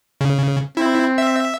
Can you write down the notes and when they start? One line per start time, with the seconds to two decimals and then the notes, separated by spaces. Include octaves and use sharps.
0.21 C#3
0.77 C4 E4
1.18 E5